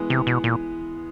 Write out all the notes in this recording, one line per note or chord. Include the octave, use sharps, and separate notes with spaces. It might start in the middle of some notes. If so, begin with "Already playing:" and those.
Already playing: E3 G#3 B3
C3
B2
A#2